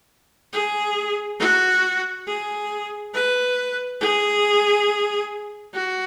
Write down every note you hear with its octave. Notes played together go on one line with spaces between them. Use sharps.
G#4
F#4
G#4
B4
G#4
F#4